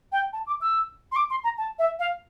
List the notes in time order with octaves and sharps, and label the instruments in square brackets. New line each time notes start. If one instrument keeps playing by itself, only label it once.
[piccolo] G5
A5
D6
E6
C6
D6
C6
A#5
A5
E5
F5